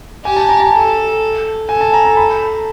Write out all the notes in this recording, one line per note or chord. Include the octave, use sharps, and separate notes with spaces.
G4 G#5
A5
A#5
A5
A4
A4 G#5
A5
A#5
A5
B5